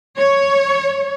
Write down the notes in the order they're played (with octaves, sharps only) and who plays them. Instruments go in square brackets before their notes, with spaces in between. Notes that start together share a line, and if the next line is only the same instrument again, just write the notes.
[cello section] C#5